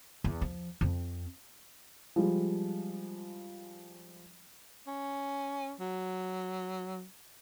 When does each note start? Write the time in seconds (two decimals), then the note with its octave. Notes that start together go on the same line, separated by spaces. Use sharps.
0.24 E2
0.41 F3
0.81 F2 C4
2.16 F3 G3 G#3
4.87 C#4
5.80 F#3